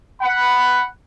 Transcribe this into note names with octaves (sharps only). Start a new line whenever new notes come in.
F#5 B5